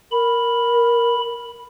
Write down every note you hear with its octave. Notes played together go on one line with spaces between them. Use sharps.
A#4 B5